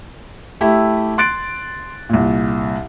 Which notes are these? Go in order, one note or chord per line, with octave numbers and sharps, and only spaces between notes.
A3 E4 G4
C6 F#6 A6 D7
C2 A#2